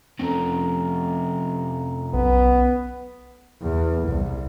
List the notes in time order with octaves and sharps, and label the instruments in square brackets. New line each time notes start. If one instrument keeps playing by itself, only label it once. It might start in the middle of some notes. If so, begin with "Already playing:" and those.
[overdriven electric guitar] F2 C3 [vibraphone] C#4 A4 A#5
[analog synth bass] B1 [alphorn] B3
[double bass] E2
C2